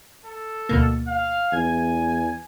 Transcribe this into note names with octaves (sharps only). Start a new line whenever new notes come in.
A4
D2 B2 A#3
F5
E2 G#5 G#6